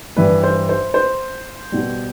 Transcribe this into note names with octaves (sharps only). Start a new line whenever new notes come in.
G2 E3 G3 B4
C5
C5
C5
B2 G3